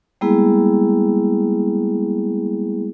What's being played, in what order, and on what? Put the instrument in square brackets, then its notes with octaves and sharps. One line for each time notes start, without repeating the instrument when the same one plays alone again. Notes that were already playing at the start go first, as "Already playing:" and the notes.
[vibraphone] G3 G#3 A#3 B3 E4 G#4